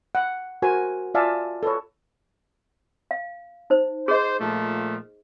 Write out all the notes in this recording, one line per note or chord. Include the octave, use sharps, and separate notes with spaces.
F#5
F#4 A#4 C5 G#5
F4 D5 E5 F5 G#5 A5
A4 B4 C#5
F5
D#4 C5
G#4 C5 D#5
A#2 F3 A3